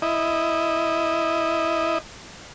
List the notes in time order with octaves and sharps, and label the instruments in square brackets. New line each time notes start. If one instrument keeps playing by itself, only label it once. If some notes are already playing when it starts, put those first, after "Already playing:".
[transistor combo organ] E4 D#5